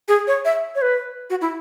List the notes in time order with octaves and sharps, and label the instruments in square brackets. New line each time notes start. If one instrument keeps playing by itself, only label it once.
[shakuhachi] G#4
C#5
E5
C#5
B4
F#4
E4